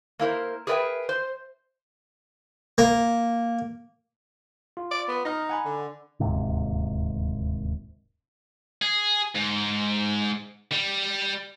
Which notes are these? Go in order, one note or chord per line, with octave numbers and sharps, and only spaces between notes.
A#3 E4 A#4 C5
G#4 A#4 B4 D5 E5 G5
C5
A#3
F4
D5
B3
D#4 D#6 F6 A#6
F#5 G#5 B5
D3
D1 D#2 G#2 C3
G#4
G#2
G3